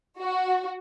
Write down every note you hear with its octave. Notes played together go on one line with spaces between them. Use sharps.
F#4